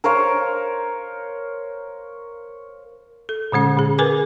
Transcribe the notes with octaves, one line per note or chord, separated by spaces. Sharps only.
A#4 C5 C#5 F5
A4
A#2 D3 G#3 C#4
A#2 G#4
G#4 A#4 B4 G#5 D6